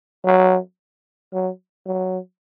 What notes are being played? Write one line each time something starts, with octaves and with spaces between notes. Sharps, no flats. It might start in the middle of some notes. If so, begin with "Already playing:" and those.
F#3
F#3
F#3